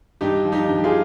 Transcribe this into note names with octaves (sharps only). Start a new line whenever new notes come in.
G2 D#4 G4
F3
D#4 G4
G2
G4
F4 G#4